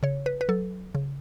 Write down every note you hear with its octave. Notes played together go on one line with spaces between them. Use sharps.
C#3 C#5
B4
B4
F#3 A4
C#3